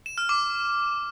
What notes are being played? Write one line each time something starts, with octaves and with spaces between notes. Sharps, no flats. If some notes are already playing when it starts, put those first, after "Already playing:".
E7
F6
D6